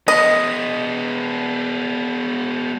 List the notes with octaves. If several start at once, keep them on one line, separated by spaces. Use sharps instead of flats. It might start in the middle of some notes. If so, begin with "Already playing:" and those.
G#3 B3 D#5